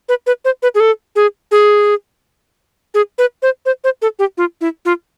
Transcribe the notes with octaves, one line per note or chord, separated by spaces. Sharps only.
B4
B4
C5
B4
G#4
A4
G#4
G#4
G#4
B4
C5
C5
C5
A4
G4
F4
E4
F4